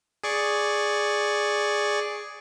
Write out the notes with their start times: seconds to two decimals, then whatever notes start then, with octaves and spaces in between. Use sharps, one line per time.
0.24 G#4 D5 C#6